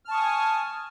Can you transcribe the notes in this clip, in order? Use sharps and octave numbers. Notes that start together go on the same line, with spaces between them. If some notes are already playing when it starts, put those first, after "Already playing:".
G#5 A5 C#6 D#6 F6